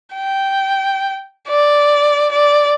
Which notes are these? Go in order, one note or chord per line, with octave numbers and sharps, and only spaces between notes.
G5
D5
D5